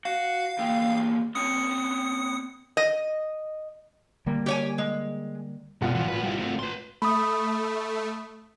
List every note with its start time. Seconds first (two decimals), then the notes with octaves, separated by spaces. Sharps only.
0.05 F#4 F5
0.59 E2 A#3 G5
1.35 B3 C4 C#5 D#6 C#7
2.77 D#5
4.26 D3 G3 A#3
4.46 G4 C#5 G#5
4.78 G#3
5.81 G#1 B2 F4 F#5
5.95 E3 F3
6.08 A2 B4
6.23 G3 E4
6.39 A3 C4
6.59 B4 C6
7.02 A3 B5 D#6